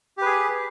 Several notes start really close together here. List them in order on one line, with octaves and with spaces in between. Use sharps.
G4 B4 G#4